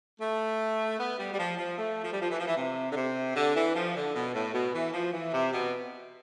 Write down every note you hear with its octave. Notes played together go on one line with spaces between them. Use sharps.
A3
B3
G3
G3
F3
F3
A3
F3
G3
F3
E3
F3
E3
C3
D3
C3
D3
E3
F3
D3
B2
A2
B2
E3
F3
E3
C3
B2